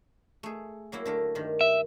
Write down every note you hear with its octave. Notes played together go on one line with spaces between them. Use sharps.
A3 G#4
F#3 A#3 E4
D3 A3 A#4
G2 D#3
E5